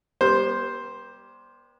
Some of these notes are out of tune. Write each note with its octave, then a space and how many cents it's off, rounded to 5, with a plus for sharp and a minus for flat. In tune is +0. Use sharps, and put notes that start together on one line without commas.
G3 +0 B3 -45 C5 +0